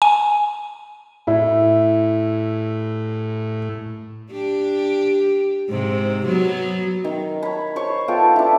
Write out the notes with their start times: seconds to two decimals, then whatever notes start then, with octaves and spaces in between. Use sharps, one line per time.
0.02 G#5
1.27 A2 E4
4.30 D4 G4
5.69 G#2 C3
6.26 F#3 B3
7.04 D#3
7.43 C#5 B5
7.76 C5 C#5 C#6
8.08 B3 F4 A4 G5
8.36 D4 E4